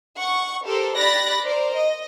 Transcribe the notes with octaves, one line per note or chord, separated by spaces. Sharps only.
F#5 C#6
G4 A4 A#4 C5
G4 D5 B5 F#6 A6 A#6
A#4 C5 D5
D#5